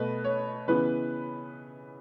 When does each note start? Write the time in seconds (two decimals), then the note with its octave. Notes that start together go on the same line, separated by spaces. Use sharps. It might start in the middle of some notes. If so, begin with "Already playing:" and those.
Already playing: B2 A3 B4
0.24 C#5
0.68 C#3 E3 B3 B4